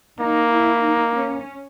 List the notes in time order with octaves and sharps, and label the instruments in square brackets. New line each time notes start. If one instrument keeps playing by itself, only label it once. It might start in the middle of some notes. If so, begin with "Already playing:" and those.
[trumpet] A#3 [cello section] D#4
[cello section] E4
D#4
C#4